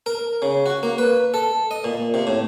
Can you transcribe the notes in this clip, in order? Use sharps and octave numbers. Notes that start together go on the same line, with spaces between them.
A#4
C#3
F#4
A#3
B4
A4
D#5
A#2
C3
A2